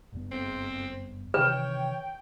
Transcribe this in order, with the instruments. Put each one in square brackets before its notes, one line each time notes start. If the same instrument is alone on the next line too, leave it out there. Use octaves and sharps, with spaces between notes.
[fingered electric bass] F#1 G2 B3
[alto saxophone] C4
[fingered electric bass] C3 D#3 E3 [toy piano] B4 [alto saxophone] C#5 [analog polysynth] G5